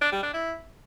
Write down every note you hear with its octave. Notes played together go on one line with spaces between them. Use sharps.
D4
G3
D4
E4